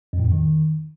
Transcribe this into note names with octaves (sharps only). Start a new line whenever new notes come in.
F2
A2
F2
D#3